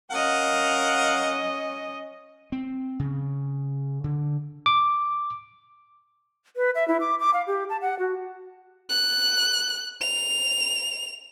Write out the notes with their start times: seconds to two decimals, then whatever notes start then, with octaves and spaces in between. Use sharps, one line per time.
0.11 C#4 A#4 D#5 F5 F#5
2.52 C4
2.99 C#3
4.04 D3
4.66 D6
6.56 B4
6.75 E5
6.88 E4
7.01 D6
7.20 D6
7.34 F5
7.47 G4
7.69 A5
7.81 F#5
7.99 F#4
8.89 F#6
10.01 F7